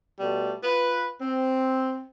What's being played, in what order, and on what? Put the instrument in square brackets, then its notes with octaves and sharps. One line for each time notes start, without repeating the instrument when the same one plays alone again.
[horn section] B2 G3 A3
F4 B4
C4